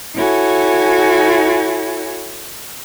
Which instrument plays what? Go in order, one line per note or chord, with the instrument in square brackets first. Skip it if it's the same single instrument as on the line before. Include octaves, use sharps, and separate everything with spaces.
[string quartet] E4 F#4 A4 C#5 G#5